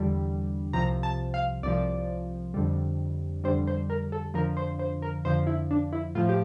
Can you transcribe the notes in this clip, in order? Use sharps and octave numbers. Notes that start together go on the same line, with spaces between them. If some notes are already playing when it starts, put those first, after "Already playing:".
Already playing: E2 D3 G3
C2 C3 F3 A#5
A5
F5
C2 C3 F3 D5
F2 D3 G3
F2 D3 G3 C5
C5
A#4
A4
F2 D3 F3 A#4
C5
C5
A#4
F2 D3 F3 C5
E4
D4
E4
A2 F3 F4
G4